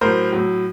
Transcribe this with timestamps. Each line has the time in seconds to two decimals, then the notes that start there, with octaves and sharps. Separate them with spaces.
0.01 A2 F#3 A#4 C5
0.33 A2 F#3